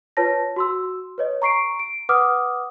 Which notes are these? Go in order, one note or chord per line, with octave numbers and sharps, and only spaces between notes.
F4 B4 C#5 A5 A#6
F#4 C6 E6
B4 C#5 D#5
A#5 C#6 C7 D7
D7
B4 F#5 D6 D#6 F6